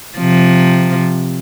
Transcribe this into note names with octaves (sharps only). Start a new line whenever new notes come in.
C3 F3